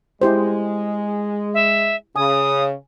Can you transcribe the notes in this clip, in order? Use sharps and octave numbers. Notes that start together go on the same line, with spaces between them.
G#3 E4 G4 C5
E5
C#3 G#5 D#6